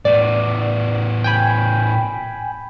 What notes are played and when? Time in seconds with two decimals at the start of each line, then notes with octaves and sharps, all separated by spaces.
0.05 A2 B3 D5
1.24 G5 G#5 B5